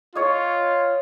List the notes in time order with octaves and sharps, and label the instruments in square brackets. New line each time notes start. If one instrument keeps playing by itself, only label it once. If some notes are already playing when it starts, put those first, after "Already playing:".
[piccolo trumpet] F4 [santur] C#5 D#5